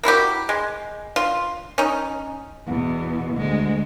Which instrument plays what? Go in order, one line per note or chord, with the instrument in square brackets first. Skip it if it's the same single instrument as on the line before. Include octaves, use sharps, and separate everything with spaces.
[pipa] A#3 E4 F#4 G4
G#3
F4
C#4 D#4
[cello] E2 B2
D2 G#3